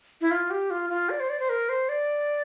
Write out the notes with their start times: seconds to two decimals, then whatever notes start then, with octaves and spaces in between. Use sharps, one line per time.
0.21 E4
0.31 F4
0.50 G4
0.70 F4
0.90 F4
1.10 D5
1.20 C5
1.29 D5
1.40 C5
1.49 A#4
1.69 C5
1.89 D5